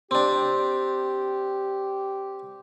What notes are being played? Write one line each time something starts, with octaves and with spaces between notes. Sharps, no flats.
C4 D4 G4